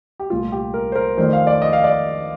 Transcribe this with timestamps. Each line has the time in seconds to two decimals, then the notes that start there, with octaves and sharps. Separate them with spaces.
0.20 G4
0.30 C2 A#2 A3 F4
0.52 G4
0.74 A#4
0.92 C5
0.95 A#4
1.17 F2 D#3 A3 D4 C5
1.33 F5
1.47 D5
1.62 D#5
1.73 F5
1.84 D5